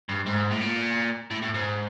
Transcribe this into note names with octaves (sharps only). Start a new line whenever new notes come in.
G2
G#2
A2
A#2
A2
A2
G#2